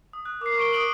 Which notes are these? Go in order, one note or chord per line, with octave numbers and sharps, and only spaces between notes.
D#6
F#6
A#4 D6 C7
C#6 D7 G7
D#6 D7 F#7